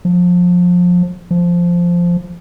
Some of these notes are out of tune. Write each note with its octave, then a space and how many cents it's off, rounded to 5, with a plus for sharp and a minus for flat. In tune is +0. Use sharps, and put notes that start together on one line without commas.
F3 +25
F3 -5